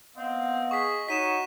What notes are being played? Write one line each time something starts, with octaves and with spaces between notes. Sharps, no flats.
B3 C4 D#5 F5 F#5
G#4 C#6 B6
D#4 F#4 C#5 B6 D#7 E7